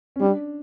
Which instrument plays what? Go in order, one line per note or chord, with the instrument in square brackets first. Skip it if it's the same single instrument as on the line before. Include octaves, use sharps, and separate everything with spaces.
[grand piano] C#4
[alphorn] G3 [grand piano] D4